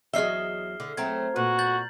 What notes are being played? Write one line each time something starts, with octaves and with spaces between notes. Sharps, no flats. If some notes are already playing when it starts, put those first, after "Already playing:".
E2 F#3 G#4 D#5 E5 F6 C7 G7
D3
F#3 A3 C4 A#5 G#6
A#2 F#4 B4
G6 A6 F#7